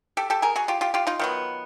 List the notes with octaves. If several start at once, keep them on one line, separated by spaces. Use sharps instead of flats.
G4 A4
G4 A4
G#4 A#4
F#4 G#4
F4 G4
F4 G4
F4 G4
D#4 F4
D#3 F#3 B3